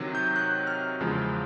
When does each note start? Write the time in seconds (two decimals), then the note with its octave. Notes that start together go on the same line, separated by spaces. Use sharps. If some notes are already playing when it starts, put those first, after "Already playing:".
Already playing: C3 D#3 F#3
0.15 G6
0.36 F#6
0.67 F6
1.00 E2 C#3 F3 G#3